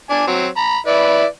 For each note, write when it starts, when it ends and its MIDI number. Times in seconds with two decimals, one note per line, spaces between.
0.10 0.25 62
0.10 0.25 80
0.27 0.46 54
0.27 0.46 60
0.57 0.77 82
0.57 0.77 83
0.87 1.25 64
0.87 1.25 71
0.87 1.25 74